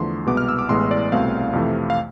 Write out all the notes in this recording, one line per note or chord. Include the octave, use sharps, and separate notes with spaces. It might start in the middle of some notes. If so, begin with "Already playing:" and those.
Already playing: E2 D3 F3 A3 C6
C2 B2 G#3 B3 D6
F6
E6
D6
A1 A2 G#3 B3 C6
D5
C2 B2 A3 C4 F5
F2 C3 E3 A3
F5